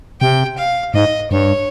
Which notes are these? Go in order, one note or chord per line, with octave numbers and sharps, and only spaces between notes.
C3 G5
F5
G#2 D#5
G2 C#5